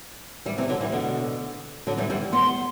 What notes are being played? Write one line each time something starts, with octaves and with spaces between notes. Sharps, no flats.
E3 G3
C3 E3
D3 F#3
E3 G3
B2 D3
D3 F#3
E3 G3
E3 G3
G3 B3 C6